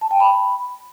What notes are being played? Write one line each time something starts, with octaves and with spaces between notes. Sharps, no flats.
A5
G5
B5